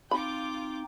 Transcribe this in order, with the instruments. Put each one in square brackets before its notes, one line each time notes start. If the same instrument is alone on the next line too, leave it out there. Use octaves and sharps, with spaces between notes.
[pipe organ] C4 D#4 [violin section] F4 D6 G6 [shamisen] B5